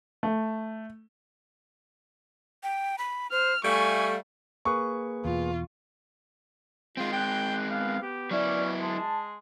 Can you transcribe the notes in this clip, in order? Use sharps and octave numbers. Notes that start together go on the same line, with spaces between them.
A3
G5
B5
C5 F6
G3 A3 F5 G#5 C#6
A#3 G#4 B4 C#6
E2 B2 F4
G#3 C4 F4
G5 F#6
B3 F5
G4
F#3 C#4 E4 D5
G#3 A5